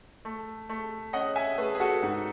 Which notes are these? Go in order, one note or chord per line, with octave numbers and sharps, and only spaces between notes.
A3
A3
C#4 D#5 F#5
E5 G#5
A3 G#4 B4
G#4
F#4 A4
G#2 D#4 F#4